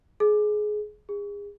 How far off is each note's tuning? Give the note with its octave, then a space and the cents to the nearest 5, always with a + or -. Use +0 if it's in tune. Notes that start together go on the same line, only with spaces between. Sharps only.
G#4 +20
G#4 -35